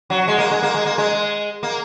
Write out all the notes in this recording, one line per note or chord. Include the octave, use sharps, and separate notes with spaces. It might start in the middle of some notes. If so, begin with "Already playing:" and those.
F#3
G#3
A#3
G#3
A#3
G#3
A#3
G#3
A#3